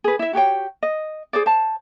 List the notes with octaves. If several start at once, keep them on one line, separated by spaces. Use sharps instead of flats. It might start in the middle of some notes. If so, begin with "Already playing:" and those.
G#4 B4
E4 E5
F#4 G4 C#5 G5
D#5
G#4 C5 D5
C5 A5